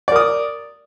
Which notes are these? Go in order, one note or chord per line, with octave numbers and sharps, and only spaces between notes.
A#4 D5 D#6